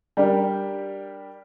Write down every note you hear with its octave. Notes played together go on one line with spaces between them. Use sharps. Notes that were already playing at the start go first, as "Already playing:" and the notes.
G3 D4 G4 A#4